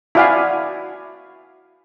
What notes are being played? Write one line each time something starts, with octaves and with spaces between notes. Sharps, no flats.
E4 F#4 D5 F5 F#5 G#5